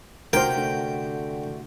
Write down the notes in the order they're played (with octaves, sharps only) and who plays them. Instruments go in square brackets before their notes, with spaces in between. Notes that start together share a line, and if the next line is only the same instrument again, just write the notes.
[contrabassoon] D2 [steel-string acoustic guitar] C3 A3 F#4 [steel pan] A#4 C5 [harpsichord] G5
[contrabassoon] D3